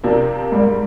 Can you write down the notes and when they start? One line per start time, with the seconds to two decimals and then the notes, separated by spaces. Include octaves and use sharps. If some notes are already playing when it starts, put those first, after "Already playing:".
0.03 C3 F3 A#3 D4
0.52 G#2 G3 A#3